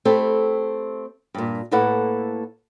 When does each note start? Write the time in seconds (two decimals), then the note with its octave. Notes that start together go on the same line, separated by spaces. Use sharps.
0.05 A3 C4 E4 G4 A4
1.34 G2 A#2
1.71 A2 A#3 E4 A4 B4 F#5